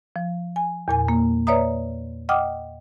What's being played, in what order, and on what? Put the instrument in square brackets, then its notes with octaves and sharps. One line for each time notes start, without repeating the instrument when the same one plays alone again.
[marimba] F3
G#5
E2 A#2 G#5
A#3
B4 C#5 D5 E5 A#5 D#6
D#5 F#5 G5 D6 D#6 F6